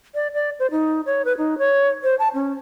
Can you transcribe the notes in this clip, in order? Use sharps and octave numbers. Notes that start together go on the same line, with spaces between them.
D5
D5
C5
D#4
C#5
B4
D#4
C#5
C5
A5
C#4